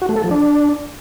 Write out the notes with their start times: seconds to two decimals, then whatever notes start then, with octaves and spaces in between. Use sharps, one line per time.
0.02 F#4
0.09 A3
0.16 A4
0.24 F3
0.31 D4